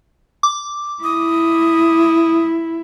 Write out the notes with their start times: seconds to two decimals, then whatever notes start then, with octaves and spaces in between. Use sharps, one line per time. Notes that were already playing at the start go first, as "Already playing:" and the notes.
0.43 D6
1.04 E4 D#6